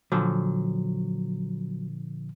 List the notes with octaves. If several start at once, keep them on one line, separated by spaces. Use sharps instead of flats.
A#2 D3 F3 F#3